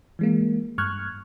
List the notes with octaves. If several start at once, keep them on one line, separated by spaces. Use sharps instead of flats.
E3 G#3 A#3
G2 C#6 F6 F#6 G#6